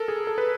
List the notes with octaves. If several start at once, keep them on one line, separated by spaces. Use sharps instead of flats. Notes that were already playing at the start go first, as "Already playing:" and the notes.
Already playing: A4 A#4
G#4
A4
B4